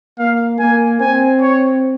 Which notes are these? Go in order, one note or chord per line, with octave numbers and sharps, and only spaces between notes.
A#3 F5
A#3 G#5
C4 G#5
C#5